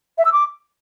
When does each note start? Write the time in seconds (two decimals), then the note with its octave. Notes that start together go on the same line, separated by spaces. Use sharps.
0.18 E5
0.25 E6
0.32 D6